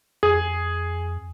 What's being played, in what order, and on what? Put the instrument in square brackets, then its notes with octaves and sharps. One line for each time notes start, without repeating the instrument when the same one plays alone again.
[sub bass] F2 [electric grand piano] G#4